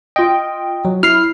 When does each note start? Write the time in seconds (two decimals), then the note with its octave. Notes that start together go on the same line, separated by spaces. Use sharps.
0.16 F4 D#5 G5
0.85 F#3
1.03 E4 F6 C7